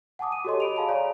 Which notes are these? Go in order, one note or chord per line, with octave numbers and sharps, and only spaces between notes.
F#5 G#5 A5 D6 D#6
D#7
F#4 G4 A4 C#5 D#5 C6
B5 D7 F7
G#4 F5 G#5 A5 B5
C#5 D5 F5 G#5 A#5